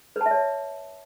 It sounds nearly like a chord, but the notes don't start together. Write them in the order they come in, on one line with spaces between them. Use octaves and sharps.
B4 A5 E5 C#5